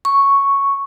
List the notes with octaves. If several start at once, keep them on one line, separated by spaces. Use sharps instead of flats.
C#6